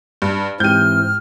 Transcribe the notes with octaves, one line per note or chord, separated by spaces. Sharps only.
G2
G#2 E3 C4 G4 F6 G6 D#7